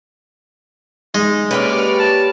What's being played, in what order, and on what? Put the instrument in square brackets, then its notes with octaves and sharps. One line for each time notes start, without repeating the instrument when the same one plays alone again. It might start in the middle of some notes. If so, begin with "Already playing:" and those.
[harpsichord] G#3 [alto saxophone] D#4
[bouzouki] A#3 G4 B4 [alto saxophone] C#4 [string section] C#5 D5 F6
[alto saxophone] A5